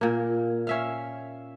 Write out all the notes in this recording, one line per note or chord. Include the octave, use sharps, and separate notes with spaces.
A#2 A#3
C#4 E5 F5